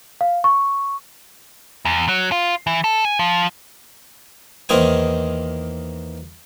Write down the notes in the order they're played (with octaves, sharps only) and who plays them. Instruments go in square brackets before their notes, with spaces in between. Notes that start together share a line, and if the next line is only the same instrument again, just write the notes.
[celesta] F5
C#6
[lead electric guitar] E2
F#3
F4
E3
A4
G#5
F3
[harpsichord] E2 D#3 A#3 D#4 C5 G#5